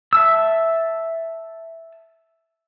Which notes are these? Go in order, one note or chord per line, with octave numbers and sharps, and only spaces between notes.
E5 A5 E6